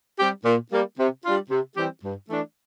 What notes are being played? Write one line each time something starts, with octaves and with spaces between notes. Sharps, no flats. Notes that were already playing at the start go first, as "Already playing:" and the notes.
G3 C4 G4
A#2
G3 A#3
C3
G3 D4 F4
C3
E3 G3 C4 G4
G2
E3 A3 D4